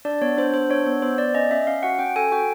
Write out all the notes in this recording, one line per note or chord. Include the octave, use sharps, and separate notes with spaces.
D4 D5
B3 C#5
D4 C5
B3 C5
D4 C#5
B3 C#5
B3 C5
B3 D5
C#4 D#5
C#4 E5
C#4 F5
F#4 F#5
C#4 G5
A4 G#5
F#4 G5